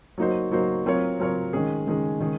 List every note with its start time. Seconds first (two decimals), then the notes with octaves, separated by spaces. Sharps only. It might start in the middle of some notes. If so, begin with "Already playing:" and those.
0.18 F#3 A#3 D#4 F#4 C5
0.52 F#3 A#3 D#4 F#4 C5
0.85 F#3 C4 F4 A#4 C#5
1.19 F#3 C4 F4 A#4 C#5
1.53 D#3 G#3 C#4 G#4
1.87 D#3 G#3 C#4 G#4
2.20 D#3 G#3 C#4 G#4